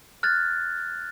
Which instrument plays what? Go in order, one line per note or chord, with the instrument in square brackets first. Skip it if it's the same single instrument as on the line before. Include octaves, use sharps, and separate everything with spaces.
[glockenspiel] F6 F#6 G#6 A6